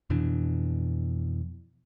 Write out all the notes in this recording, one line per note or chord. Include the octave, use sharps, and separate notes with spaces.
F2 B2 E3 D4